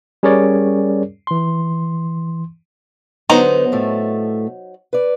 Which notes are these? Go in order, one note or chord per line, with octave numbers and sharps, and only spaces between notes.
G3 C#4 G#4 A#4 C#5 D5
E3 C6
D3 F#3 B3 D#4 C5
A2 A3
B4 D5